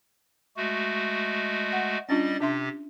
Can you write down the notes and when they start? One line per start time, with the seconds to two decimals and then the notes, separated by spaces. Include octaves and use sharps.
0.57 G#3 A3 F#4
1.73 F#5
2.09 G3 C#4 D4 F4 D#5 A6
2.40 C3 D4 G4 E5 C6